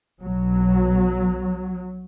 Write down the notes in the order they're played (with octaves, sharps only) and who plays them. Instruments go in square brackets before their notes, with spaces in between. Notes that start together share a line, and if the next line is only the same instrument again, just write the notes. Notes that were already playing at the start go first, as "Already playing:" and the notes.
[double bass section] B1 B2 F#3